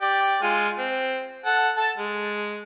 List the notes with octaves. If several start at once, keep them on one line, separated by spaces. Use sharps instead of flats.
G4 D5
G#3 F4 G#5
C4
A4 F#5
A4 A5
G#3